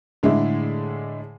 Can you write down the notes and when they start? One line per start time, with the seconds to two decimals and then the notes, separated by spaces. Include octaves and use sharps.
0.23 A2 D3 G#3 D4 E4